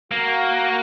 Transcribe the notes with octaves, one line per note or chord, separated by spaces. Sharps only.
A#3 F#4